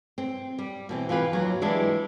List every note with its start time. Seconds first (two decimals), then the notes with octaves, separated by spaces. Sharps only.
0.18 C4
0.59 G3
0.89 B2 E3 C4
1.09 E3 F4 G4 B4
1.33 D#2 F#3
1.62 E3 G3 G#3 D4 E4